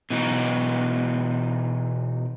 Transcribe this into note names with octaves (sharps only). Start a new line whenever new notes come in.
B2 E3 D#4